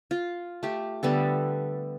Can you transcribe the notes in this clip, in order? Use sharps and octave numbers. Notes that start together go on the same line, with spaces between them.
F4
A3 G4
D3 G3 B3 A4